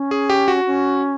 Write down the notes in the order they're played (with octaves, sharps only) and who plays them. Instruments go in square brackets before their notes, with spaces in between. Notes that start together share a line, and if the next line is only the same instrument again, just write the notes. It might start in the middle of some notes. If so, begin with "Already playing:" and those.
Already playing: [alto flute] C#4
[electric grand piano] G#4
G4
F#4
[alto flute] C#4